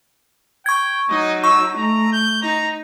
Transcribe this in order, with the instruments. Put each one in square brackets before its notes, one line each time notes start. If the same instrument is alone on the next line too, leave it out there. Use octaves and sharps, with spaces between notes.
[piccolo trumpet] G5 [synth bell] C#6 G#6
[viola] F#3 D#4 [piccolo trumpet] D#5
[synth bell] C#6 [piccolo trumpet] E6
[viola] A3 [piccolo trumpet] A#5
[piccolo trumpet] G6
[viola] D#4 [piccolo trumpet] A#5